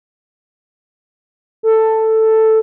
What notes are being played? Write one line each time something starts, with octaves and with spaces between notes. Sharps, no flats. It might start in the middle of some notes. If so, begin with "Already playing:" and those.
A4